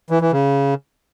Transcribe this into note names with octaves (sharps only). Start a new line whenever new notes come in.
E3
E3
C#3